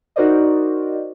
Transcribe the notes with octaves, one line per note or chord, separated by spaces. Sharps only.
D#4 F#4 A#4 C5 D5 D#5